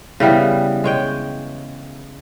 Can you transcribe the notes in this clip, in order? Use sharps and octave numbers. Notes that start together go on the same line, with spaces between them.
C#3 E3 G3 B3
G#3 C#5 G5